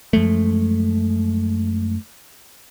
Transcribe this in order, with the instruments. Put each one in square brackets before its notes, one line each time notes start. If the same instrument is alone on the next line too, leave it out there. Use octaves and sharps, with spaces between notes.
[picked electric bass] F#2 F3 G#3 A3